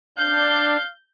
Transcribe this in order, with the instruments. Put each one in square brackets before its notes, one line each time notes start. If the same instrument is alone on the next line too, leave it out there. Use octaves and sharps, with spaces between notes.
[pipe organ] D4 [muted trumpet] F5 [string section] G6